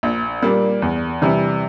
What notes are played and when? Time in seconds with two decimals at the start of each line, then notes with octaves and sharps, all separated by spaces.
0.03 A#1
0.42 A#2 G3 A#3 D4
0.82 E2
1.22 C3 E3 G3